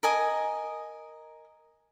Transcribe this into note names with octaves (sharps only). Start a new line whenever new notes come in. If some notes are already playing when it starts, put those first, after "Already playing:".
A#4 D#5 G#5 D#6